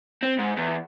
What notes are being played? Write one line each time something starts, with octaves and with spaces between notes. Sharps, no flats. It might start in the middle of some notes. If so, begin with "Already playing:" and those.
C4
G#2
E2